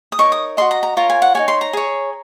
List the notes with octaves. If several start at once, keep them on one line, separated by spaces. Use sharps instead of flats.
D#6
D#4 A#4 C#5 C#6
D#6
F#4 A#4 D#5 C6
A#5
A#5
F4 A#4 C#5 A#5
G#5
F#5
D#4 F#4 C#5 G#5
C6
A#5
G#4 C#5